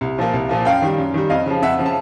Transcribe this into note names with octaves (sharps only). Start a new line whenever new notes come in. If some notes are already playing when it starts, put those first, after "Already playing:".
C2
A#2 F3 A#3
C2
A#2 F3 A#3
F#2 F5 G5
D#3 G3
F#2
D#3 G3
F2 D#5 F5
C#3 F3
F2 E5 F#5
C#3 F3
A5